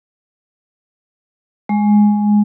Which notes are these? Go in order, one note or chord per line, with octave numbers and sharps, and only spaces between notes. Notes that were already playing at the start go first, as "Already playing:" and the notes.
G#3